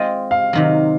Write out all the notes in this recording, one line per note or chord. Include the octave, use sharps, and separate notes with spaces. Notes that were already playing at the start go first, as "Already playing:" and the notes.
Already playing: G#3 C4 F4 C5 D#5
F5
C3 D#3 F#3